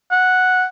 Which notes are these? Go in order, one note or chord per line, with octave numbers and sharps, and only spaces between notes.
F#5